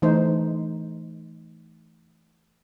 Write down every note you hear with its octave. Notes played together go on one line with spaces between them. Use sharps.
E3 A3 D#4 C5